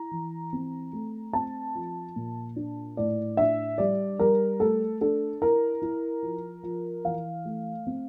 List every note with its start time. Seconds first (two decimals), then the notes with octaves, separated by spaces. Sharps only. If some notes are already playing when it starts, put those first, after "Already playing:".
Already playing: E4 A#5
0.11 E3
0.53 C4
0.93 A3
1.33 C4 A5
1.75 F3
2.16 A#2
2.56 D4
2.97 A2 D5
3.37 D4 E5
3.78 G3 D5
4.19 G3 A#4
4.60 A3 A4
5.01 D4 A4
5.42 E4 A#4
5.82 E4
6.23 F3
6.63 F3
7.05 E3 F5
7.45 A3
7.87 C4